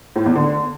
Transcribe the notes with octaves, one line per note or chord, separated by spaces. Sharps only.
A2
E2
D3